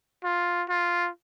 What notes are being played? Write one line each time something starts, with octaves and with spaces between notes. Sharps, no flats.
F4
F4